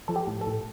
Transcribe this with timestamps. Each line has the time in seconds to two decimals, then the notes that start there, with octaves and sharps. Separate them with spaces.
0.08 F3 A4
0.16 G4
0.27 A2
0.41 A4
0.47 A2